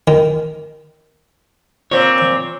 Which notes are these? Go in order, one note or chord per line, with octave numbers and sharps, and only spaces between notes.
D#3
A#2 C4 C#5